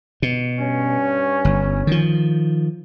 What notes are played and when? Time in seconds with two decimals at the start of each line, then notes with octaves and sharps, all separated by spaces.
0.22 B2
0.58 G2 C#4
1.45 G1
1.87 D#3 F3